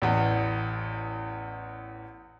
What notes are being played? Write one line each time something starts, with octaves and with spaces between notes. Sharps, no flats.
A1 E2